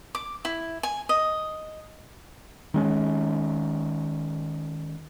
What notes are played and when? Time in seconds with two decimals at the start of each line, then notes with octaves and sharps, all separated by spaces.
0.15 D6
0.45 E4
0.83 G#5
1.09 D#5
2.74 D#3 G#3 C#4